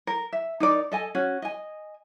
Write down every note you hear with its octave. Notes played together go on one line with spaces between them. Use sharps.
A#4
E5
D#4 A#4 D5
A4 D#5 G#5
C#4 F#4
D#5 G#5